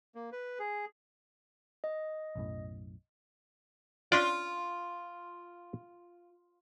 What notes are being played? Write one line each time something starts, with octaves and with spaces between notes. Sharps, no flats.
A#3
B4
G#4
D#5
B1 F#2 A2
C#4 D4 F4 D5